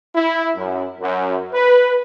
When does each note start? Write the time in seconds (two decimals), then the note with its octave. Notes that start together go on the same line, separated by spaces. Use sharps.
0.15 E4
0.56 F#2
1.01 F#2
1.53 B4